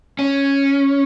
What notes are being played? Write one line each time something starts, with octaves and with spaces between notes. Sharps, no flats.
C#4